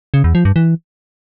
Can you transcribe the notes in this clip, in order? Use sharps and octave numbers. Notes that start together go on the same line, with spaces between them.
C#3
E2
F3
G2
E3